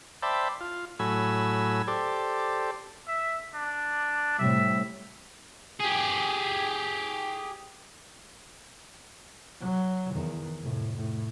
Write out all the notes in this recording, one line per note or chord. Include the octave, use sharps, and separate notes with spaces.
C5 D5 E5 G5 A5 B5
F4
A2 F#3 G#5 B5 E6
G4 A4 C5 D5
E5
D4
A2 C3 G3 E5
G4 G#4
F#3
E2 D#3
F1 A2
A2